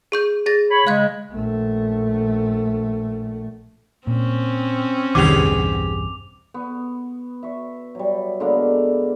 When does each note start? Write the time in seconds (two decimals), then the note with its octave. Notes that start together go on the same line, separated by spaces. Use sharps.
0.12 G#4 C#6 G6
0.46 G#4 A6 A#6
0.70 C#5 B5
0.87 C#3 G#3 F5 F#6 G#6
1.32 A#1 A3
4.07 A#2 C4 C#4
5.15 B1 E2 G2 D3 G4 G#4 D6 F7
6.54 B3 C#6
7.43 E5 C#6
7.95 F#3 G3
8.40 D3 G#3 A#3 B3